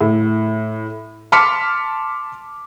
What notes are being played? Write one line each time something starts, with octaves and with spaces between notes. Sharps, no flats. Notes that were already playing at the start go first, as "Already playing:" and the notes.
A2
A5 C6 D6 F6 B6 C#7